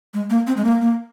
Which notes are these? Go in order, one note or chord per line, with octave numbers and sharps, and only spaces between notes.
G#3
A#3
C4
G#3
A#3
A#3